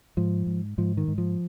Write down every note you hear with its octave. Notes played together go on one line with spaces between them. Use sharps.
G#2 F3
G#2
G#2 F3
D#3
G#2
F3